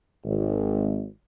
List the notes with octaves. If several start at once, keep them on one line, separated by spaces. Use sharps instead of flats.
G#1